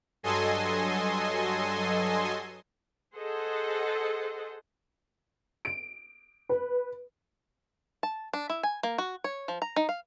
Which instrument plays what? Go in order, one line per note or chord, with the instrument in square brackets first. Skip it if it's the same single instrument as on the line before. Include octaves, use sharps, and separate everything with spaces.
[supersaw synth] G2 F#3 A4 D#5 G#5 C6
[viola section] G#4 A4 C5 D#5 F#5
[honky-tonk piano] D7
B4
[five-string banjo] A5
D4
E4
G#5
A#3
F#4
C#5
F3
A#5
D#4
F5